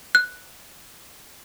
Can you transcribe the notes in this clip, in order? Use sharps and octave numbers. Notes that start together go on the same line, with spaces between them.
F#6